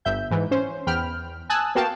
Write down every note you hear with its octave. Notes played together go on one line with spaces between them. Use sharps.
G1 E5 G6
G#2 E3
C#4 C5
E2 G5 B5 F6
G#5 A5 D#6 E6 F#6
A#3 B3 F#4 F5 G5 A5